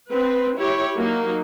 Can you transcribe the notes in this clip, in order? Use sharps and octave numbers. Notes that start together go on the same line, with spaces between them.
C4 B4
E4 G4 C#5
F#3 A#3 D#4